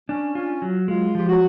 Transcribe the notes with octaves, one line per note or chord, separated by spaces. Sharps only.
C#4 D4
C#4 F4
F#3
G#3 F4
F3 G4
F#4